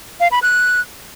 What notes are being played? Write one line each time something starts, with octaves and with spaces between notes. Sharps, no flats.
F5
B5
F#6